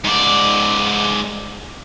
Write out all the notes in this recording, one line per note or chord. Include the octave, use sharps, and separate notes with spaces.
G#2 D5